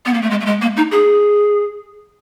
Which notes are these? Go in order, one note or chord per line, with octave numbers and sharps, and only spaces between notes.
B3
A#3
A3
G#3
A3
G#3
A#3
D#4
G#4